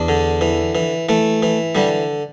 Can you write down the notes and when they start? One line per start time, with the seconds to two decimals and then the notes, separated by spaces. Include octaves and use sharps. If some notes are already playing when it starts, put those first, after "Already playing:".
Already playing: E2 D4
0.08 D3
0.41 E3
0.75 E3
1.09 E3 A3
1.43 E3
1.75 D3 G3